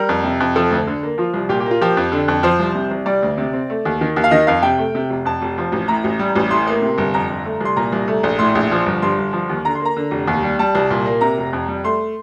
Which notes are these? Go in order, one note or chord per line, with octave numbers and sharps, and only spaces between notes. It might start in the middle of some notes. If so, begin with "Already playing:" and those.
Already playing: G3 A#4
F2
C3
F2
F3 A4
D2
D3
A#3
F3 F4
C2
A#2 G4
G4
A#3 F4
F3 G4
F2
D3
F2
F3 C5
C2
C3
C2
G3 D5
D2
C3
C4
A3
D#2
D#3
D#2
F5
D#3 D#5
F2 F5
C3 G5
A3
C3
F1
F2 A5
F1
F3
A1
A2 A#5
A1
G3
A1
A2 C6
A#3
C3
G1
F2 A#5
G1
A3
C2 C6
A#2 A#5
C2
A3
A#1
A2 C6
A#1
F3
G1
G2 C6
G1
F3
D#2
D3 A#5
C6
A#3
A#5
D3
F1
D#2
G3
G3 A5
C2
A#2
A#3
C3 A#5
F1
F2
G3
A3 C6